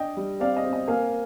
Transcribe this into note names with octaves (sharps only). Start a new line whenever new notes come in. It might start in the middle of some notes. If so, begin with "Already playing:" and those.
Already playing: D4 D#5 G5
G3
C4 D5 F5
D#5
C4
D#5
A#3 F5 G#5